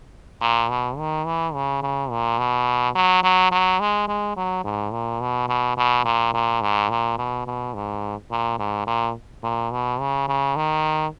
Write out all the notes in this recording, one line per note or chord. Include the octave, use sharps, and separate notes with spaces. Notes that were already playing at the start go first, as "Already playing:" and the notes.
A#2
B2
D#3
E3
C#3
C#3
A#2
B2
F#3
F#3
F#3
G#3
G#3
F#3
G#2
A#2
B2
B2
B2
A#2
A#2
G#2
A#2
B2
B2
G#2
A#2
G#2
A#2
A#2
B2
C#3
C#3
D#3